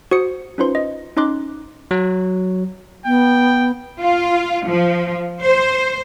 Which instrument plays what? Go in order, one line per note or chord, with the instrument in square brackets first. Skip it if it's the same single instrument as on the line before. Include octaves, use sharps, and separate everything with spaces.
[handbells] F#4 C5 D#6 C#7
C#4 D#4 F4 B4 C5 C6
D#5
C#4 D#4 D#5 C6 D6 F#6
[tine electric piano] F#3
[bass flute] B3 [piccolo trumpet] G5
[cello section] F4
F3
C5